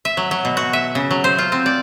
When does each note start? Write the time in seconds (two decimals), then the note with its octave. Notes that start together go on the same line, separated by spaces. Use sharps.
0.05 E5
0.17 F#3
0.31 F#3
0.45 B2
0.57 F#4
0.73 E5
0.95 C#3
1.11 F#3
1.24 C5
1.38 F4
1.52 C4
1.66 D5